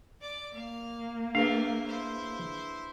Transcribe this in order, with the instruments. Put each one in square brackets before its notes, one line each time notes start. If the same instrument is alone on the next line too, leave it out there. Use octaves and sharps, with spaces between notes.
[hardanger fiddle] D5 D6
[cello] A#3 [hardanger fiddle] F5
[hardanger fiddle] A3 A#4 [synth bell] D4 G#4 B4 [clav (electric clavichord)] F5
[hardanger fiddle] E4 C5